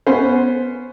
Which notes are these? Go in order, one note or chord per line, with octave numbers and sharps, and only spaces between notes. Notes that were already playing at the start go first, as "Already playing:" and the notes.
B3 C#4 C5